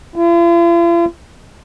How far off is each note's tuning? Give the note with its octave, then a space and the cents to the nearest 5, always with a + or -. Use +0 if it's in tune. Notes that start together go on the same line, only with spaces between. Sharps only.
F4 -45